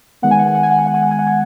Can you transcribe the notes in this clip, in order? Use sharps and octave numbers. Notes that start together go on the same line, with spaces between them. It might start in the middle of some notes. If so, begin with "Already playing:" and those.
D#3 G#3 B3 F#5
G#5
F#5
G#5
F#5
G#5
F#5
G#5
F#5
G#5
F#5
G#5
F#5
G#5